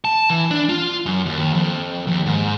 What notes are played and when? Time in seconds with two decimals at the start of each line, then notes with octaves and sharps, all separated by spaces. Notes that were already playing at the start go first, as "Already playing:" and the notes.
0.05 A5
0.30 E3
0.51 D4
0.69 F4
1.06 F#2
1.26 D#2
1.54 F2
2.07 D#2
2.26 G#2